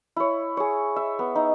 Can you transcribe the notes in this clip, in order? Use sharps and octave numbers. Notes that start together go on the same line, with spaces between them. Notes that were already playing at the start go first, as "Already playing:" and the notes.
E4 C#5
G#4 C#5
E5
B3
D#4